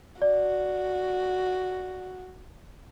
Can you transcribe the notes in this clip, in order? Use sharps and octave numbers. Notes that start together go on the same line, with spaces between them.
F#4 D5